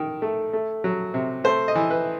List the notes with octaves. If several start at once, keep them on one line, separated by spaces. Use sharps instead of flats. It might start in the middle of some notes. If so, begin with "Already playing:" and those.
Already playing: D#3
A3
A3
F#3
C3
A3 C5
D#5
E3
B4